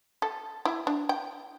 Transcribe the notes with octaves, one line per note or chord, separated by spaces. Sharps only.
A4
E4
D4
G5